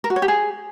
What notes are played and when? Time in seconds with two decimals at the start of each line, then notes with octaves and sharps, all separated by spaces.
0.04 A#4
0.10 F#4
0.16 C#5
0.22 G4
0.28 G#4